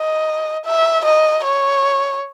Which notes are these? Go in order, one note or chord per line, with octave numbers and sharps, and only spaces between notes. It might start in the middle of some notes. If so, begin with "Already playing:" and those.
Already playing: D#5
E5
D#5
C#5